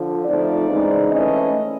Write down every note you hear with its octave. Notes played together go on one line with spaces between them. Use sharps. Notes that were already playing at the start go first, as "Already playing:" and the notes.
Already playing: D3 F3
F3 A3 C4 D#4 D5
C#3 E3 G#3 C4 D#4
E3 A3 C#4 D#5